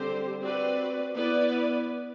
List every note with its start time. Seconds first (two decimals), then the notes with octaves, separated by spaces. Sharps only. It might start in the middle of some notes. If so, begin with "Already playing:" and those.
Already playing: D3 G3 C4 G4 C5
0.41 C4 F#4 B4 D5
1.15 B3 E4 B4 D5